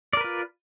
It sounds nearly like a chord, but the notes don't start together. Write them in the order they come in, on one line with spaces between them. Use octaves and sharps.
D5 A#4 B4 F4